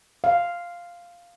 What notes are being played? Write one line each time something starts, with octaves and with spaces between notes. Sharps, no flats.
F5